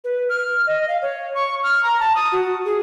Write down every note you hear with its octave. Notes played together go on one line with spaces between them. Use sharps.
B4
F6
D#5
F5
C#5
C#6
F6
A#5
A5
D#6
F#4
G#4